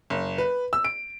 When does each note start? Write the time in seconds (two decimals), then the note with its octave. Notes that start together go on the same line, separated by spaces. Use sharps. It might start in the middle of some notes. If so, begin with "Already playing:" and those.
0.10 F#1
0.38 B4
0.73 E6
0.85 D7